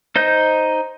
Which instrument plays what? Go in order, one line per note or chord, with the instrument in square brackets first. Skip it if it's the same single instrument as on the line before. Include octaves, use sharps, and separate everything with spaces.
[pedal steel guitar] D#4 C5 D#5 G6